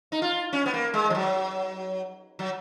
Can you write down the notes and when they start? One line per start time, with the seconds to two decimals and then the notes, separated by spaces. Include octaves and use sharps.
0.12 D#4
0.22 F4
0.53 C#4
0.66 B3
0.74 A#3
0.94 G#3
1.10 F3
1.15 F#3
2.39 F#3